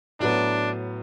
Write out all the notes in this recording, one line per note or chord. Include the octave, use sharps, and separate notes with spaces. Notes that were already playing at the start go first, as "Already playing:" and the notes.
A2 F#3 B3 D4